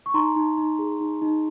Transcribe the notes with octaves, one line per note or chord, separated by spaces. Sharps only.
C#6
D#4 A#5 C6
D#4
D#4
G#4
D#4
D#4